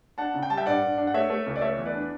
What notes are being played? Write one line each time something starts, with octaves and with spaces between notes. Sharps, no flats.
D4 F#5 A5
C#3
G5
G3 A5
E5 G5
G2 D5 F#5
G2
D4
F#5
A3 C#5 E5
A3
C#2
D5
A3 C#5 E5
E2
B4 D5
D4